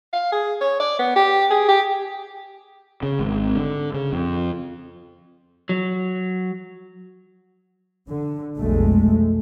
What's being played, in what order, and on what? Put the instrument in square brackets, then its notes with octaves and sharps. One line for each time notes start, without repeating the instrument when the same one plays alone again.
[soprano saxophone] F5
G#4
C#5
D5
B3
G4
G#4
G4
[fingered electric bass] C#3
G#1
D3
C#3
F2
[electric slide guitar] F#3
[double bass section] D3
F1 B1 G#3 A3